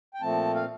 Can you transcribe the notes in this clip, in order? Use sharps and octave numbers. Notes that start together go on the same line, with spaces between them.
G5
A#2 F3 A3 C4 A5
F5